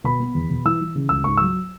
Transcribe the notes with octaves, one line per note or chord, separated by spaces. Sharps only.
B2 B5
B3
E2
B2
E3 E6
E3
C#3
C#2 E6
G#2 C#6
F#3 E6